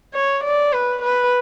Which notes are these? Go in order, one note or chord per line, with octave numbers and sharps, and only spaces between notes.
C#5
D5
B4
B4